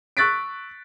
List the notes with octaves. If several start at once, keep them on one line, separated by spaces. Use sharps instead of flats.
C#6 E6 F#6 A6 B6 D7